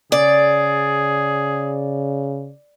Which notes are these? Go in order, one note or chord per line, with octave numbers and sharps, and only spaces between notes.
C#3 G#4 D5